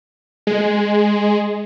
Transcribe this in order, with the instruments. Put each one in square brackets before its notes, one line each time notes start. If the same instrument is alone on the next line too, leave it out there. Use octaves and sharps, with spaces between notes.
[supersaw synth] G#3